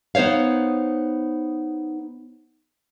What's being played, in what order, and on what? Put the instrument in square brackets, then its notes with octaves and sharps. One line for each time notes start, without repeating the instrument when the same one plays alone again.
[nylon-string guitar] B3 D#4 C5 C#5 F5